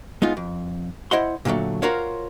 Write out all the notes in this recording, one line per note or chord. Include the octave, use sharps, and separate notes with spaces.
G#3 B3 D#4 F4
F2
E4 C5 D#5 F#5 C6
A#2 D3 F3 F#3 A3
F4 F#4 A#4 C5 C#5 F5